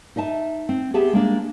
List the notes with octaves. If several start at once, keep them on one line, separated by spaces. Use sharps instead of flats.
D#4 D#5 E5 A5
C4
B3 G4 G#4 E5 A5
G#3 A#3 D4